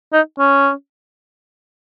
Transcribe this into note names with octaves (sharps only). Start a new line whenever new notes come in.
D#4
C#4